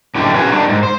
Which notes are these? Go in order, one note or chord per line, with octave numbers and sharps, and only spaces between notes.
F#2 A2 D3 D#3 A3 G4
C#4 F4 F#4 G#4 A4 B4
D#3 G3 D4
G#2
C5